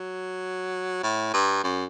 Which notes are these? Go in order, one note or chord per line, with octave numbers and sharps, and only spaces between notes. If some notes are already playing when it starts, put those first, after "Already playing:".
Already playing: F#3
A2
G2
F#2